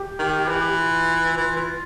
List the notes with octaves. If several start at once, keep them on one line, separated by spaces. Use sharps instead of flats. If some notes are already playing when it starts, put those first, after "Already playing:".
Already playing: G4
D#3
E3
F4
E3 F4
E3